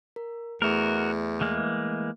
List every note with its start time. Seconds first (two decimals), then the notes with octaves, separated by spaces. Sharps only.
0.16 A#4
0.62 E2 A3 F#4 A#4 E5
1.41 E3 G#3 A#3